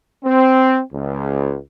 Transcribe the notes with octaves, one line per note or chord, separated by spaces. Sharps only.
C4
C#2